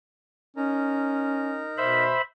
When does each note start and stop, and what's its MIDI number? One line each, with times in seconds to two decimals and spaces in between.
0.57 1.65 61
0.57 2.04 63
0.57 2.04 70
0.57 2.04 82
1.77 2.14 47
1.77 2.21 72
1.77 2.21 76
1.77 2.21 83